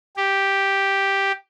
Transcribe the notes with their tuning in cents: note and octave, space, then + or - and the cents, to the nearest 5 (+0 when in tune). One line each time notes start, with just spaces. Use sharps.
G4 +0